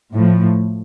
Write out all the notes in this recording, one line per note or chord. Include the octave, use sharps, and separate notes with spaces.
A2 F3